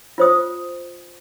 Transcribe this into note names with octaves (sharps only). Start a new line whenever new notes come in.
F4 C5 D#6